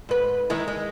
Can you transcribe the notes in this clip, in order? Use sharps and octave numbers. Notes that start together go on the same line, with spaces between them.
G#2 B4
D#3 G#3 E4
G#3